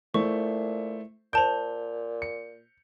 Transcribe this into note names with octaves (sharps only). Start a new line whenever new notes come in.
A#2 A3 E4 C5 C#6
A#2 C5 A5 G6 D7 F7
C#7